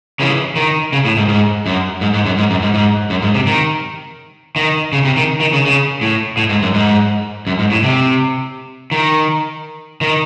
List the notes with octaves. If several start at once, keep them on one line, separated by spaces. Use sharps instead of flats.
C#3 E3
D#3
C#3
A2
G#2
G#2
F#2
G#2
G#2
F#2
G#2
F#2
G#2
G#2
F#2
G#2
C3
D#3
D#3
C#3
C3
D#3
D#3
C#3
C#3
A2
A2
G#2
F#2
G#2
F#2
G#2
A2
C3
D#3
D#3